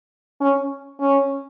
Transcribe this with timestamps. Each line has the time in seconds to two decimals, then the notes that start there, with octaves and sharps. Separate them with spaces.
0.41 C#4
1.00 C#4